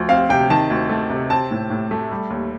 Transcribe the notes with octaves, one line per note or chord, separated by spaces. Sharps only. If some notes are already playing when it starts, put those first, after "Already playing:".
Already playing: D2 F3
C4 F5
C3 G5
D#3 A5
D2
A3
C3
C4 A5
A2
A2
A3
G3
D#2